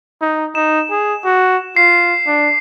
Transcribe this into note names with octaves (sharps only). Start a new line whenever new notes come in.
D#4
D#4 E7
G#4
F#4
F4 C7
D4